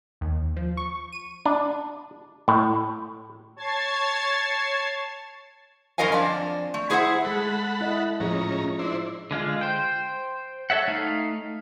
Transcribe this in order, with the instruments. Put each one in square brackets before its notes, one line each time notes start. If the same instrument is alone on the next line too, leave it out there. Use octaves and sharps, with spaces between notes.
[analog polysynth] D#2
F3
C#6
D#7
[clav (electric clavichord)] D4
A2
[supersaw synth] C#5 A5 G#6 A6 C7
[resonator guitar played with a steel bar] F#2 C#4 A#4 D#5 F5 G#5
F2 D4 D5
A3
E4 G#4 C5 D#5 E5 F#5
[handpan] G#3 A3 [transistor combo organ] A4 F#5 B5
[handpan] E4 D#5
[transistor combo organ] A2 C#4 A#5 [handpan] F3 G#4 D#5
[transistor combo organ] D4 E4 C5
[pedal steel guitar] D3 G#3 F4 F5
C5 G5
A4 C#5 E5 F#5
A3 D#4 F5